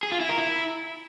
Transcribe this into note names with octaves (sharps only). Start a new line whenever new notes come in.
G#4
F4
E4
A#4
E4